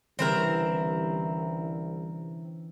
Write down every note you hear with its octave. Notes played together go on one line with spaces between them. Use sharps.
C2 D3 E3 C4 C#4 E4 A#4